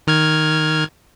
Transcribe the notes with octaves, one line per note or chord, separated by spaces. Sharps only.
D#3 F6 G#6